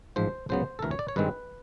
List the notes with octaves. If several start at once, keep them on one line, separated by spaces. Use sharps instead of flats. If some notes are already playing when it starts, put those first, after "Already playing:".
A1 G#2 F3 C5
C#2 C#3 F#3 B3 C5
A4
D2 C3 E3 A#4
C#5
D5
C#5
G2 D#3 G#3 C4 B4